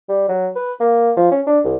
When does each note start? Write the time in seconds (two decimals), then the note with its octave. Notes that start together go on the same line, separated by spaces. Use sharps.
0.09 G3
0.29 F#3
0.55 B4
0.80 A#3
1.17 F3
1.32 C#4
1.47 D4
1.64 C2